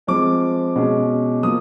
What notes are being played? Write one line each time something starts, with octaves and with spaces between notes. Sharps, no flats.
F3 G#3 C4 D6
B2 G#3 C#4
F3 A#3 D#6